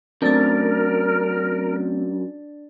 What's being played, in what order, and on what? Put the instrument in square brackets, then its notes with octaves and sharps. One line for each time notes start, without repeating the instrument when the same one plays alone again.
[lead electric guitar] F#2 [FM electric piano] A3 C4 [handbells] D4 D5 A6 [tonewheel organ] A#4